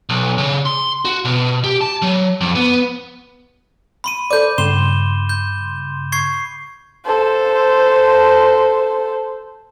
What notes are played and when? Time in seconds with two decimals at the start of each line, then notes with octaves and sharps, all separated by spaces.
0.10 B1
0.38 C#3
0.66 C6
1.05 F#4
1.25 B2
1.64 G4
1.81 A5
2.02 F#3
2.41 F2
2.56 B3
4.04 B5 C6 D#7
4.31 A4 C5 D5 D6 G6
4.58 G2 C#3 C6 E7 G7
5.29 G6
6.12 C#6 G#6 C7
7.06 A4 C5